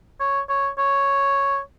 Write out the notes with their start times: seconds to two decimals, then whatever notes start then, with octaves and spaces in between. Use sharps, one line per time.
0.20 C#5
0.49 C#5
0.78 C#5